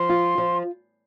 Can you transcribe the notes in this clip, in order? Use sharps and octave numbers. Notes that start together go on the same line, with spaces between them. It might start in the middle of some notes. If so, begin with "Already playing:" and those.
Already playing: F3 C6
F4
F3